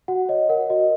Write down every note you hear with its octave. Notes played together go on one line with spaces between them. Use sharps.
F#4 F#5
C#5 D#5
A#4 F#5
F#4 D#5